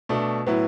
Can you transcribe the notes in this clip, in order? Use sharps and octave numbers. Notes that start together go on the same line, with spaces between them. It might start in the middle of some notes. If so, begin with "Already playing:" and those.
B2 A3 D4
A2 F#3 B3 E4